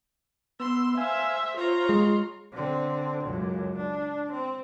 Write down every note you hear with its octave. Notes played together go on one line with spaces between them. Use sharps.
B3 C6 E6
C5 E5 F5 G#5 E6
F4 C5 C#5 A#5
G#3 C6
D3 C4
C#2 F#2
D4
C4